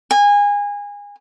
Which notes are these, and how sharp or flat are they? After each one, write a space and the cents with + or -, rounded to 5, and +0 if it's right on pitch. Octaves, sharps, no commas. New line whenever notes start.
G#5 -25